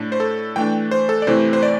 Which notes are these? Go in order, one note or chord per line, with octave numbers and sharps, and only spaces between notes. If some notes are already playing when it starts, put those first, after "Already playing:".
Already playing: A2 A3 D4
C5
A4
E3 A3 D4 G5
C5
A4
D5
C3 E3 A3 C4 E4 C5
C5
D5